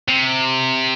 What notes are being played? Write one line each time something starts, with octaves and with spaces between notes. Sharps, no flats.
C3